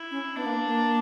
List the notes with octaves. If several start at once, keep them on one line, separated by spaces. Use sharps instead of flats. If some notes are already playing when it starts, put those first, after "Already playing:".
Already playing: E4
C#4
B3 D4
A#3
A#3